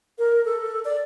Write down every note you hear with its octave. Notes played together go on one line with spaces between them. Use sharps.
A#4
A4
D5